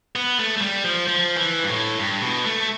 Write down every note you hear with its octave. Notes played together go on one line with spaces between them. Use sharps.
B3
A3
A3
G3
F3
F3
E3
G2
A2
G2
B2
A3